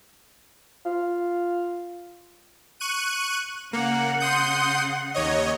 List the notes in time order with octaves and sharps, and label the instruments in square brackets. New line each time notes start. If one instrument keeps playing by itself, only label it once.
[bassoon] F4
[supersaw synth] C#6 F#6 D#7
[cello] C#3 F#5 [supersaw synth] A#3
[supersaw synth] C6 D#6 G6
D#2 C#5 D#5